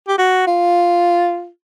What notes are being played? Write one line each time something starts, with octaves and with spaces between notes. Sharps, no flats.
G4
F#4
F4